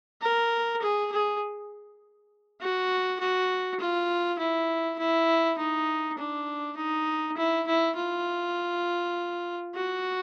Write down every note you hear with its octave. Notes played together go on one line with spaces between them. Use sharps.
A#4
G#4
G#4
F#4
F#4
F4
E4
E4
D#4
D4
D#4
E4
E4
F4
F#4